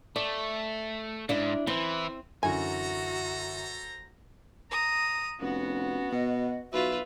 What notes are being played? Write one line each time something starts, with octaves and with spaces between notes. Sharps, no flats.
A3 D5
G#2 D4 E4 E5
E3 C4 E4
F#2 D3 E3 F#4 A4 C5 G#5 A#5
A#5 D#6
F1 B3 C#4 F#4
B2 D#5
B1 F4 F#4 B4 E5